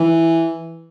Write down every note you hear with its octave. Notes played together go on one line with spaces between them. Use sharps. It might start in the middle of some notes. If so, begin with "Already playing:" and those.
Already playing: E3